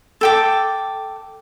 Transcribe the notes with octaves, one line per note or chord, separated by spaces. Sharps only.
A4 G5 D6